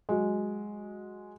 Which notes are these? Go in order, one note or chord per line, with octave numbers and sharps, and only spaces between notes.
F#3 G#3